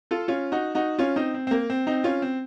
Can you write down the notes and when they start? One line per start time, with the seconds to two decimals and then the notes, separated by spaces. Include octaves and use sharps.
0.11 F4 A4
0.28 C#4 F4
0.52 D#4 F#4
0.75 D#4 F#4
0.99 C#4 F4
1.16 C4 D#4
1.34 C4
1.47 C4
1.51 A#3
1.70 C4
1.87 C4 D#4
2.04 C#4 F4
2.22 C4